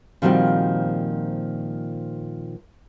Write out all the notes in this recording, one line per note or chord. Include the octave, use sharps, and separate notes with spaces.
A#2 D#3 F3 G3 C4 F#4